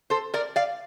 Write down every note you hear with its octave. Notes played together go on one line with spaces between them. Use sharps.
A4 C5
A#4 D5
D5 F5